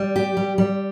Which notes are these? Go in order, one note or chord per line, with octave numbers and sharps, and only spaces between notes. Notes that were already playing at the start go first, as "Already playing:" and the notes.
Already playing: G3
G4
G3
G3